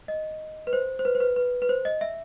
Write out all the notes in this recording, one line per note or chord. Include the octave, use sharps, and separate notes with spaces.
D#5
B4
C5
C5
B4
C5
B4
B4
B4
C5
D#5
E5